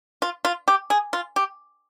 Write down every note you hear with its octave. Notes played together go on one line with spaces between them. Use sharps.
F4
F4
G4
G#4
F4
G4